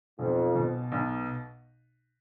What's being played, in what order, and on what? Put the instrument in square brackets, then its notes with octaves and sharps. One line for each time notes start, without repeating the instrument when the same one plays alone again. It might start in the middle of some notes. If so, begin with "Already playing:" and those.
[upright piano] B1 [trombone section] F2
[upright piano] B2
B1